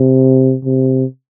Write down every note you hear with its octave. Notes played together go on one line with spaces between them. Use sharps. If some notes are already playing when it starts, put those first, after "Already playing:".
Already playing: C3
C3